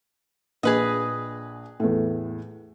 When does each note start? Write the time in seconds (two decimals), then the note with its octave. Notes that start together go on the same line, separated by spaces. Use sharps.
0.63 A#1 G#4 B4 D#5
1.80 E2 A2